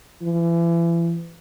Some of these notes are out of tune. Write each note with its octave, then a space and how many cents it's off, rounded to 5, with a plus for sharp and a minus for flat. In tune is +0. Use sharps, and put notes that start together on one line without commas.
E3 +35